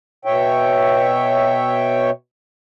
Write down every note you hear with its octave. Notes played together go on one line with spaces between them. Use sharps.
B2 C#5 E5 G5